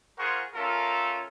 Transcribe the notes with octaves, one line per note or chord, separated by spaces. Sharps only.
F4 G#4 A#4 C5 F#5 C#6
A3 C#4 F4 A4 A#4